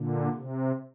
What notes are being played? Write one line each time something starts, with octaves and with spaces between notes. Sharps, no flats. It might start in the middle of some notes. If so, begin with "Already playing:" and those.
Already playing: A#2 D3
C3